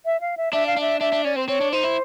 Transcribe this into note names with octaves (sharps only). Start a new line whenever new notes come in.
E5
F5
E5
D4 E5
F5
D4 E5
D4 E5
D4
C#4 D5
C4 C5
C4 C#5
D4
D#4 C5
E4